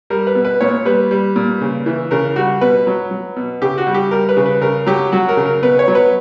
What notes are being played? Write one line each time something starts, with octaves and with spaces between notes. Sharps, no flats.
G3 A#4
B4
B2
B4
A#2 C#5
G3 B4
G3
A#2
C#3
E3
C#3 A#4
G3 F#4
B2 B4
F#3
F#3
B2
C#3 G4
F#4
G3
G4
G3 A#4
B4
C#3
B4
C#3 A#4
F#3 G4
F#3 F#4
A#4
C#3
A#4
B2 B4
C#5
F#3
B4